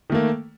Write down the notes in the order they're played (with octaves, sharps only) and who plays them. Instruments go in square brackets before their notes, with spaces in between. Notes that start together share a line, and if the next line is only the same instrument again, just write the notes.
[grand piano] D#3
A3
A#3